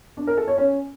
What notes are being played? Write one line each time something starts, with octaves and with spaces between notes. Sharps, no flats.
D4
A#4
A4
C#5
C#4